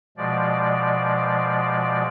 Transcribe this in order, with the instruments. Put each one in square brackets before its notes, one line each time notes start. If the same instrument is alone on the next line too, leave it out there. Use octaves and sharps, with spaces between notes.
[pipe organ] B2 F3 G#3 D5